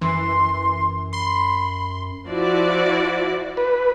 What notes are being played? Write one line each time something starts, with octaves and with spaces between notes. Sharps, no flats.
F#2 E3 C6
B5 C6
F3 E4 F#4 D5
B4